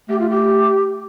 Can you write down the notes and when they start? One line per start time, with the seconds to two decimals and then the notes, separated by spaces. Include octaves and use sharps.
0.09 A3 G4
0.19 F4
0.29 G4